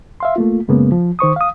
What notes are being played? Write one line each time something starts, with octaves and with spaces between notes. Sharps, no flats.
E5 F5 C6
A3 A#3 F4
F#2 C#3 G#3 A#3 B3
F3
D#3 C5 C#6 D#6
F5 D#6